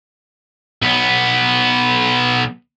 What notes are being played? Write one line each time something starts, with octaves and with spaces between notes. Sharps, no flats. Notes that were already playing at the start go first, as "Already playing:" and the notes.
B1 B3